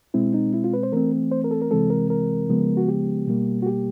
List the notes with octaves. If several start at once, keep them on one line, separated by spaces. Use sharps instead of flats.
B2 G#3 C4 E4
D#4
E4
F4
B4
C5
E3 A3 C4 A#4
C5
A#4
A4
A#4
C3 E3 G#3 C4 A4
A#4
A#4
C#3 F3 G#3 B3
F#4
G4
B2 G3 A#3
F#4
G4